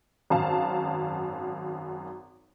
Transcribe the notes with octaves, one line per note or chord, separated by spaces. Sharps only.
G#1 F#2 F5 A5